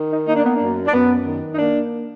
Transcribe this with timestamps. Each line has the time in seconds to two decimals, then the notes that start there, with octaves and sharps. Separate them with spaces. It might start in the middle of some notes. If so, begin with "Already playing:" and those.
Already playing: D#3
0.10 D#4
0.27 A#3 D#4
0.36 D4
0.45 B3
0.54 D4
0.60 F#2
0.86 D4
0.93 F#2 B3
1.26 D#3
1.52 D#4
1.58 A#3 D4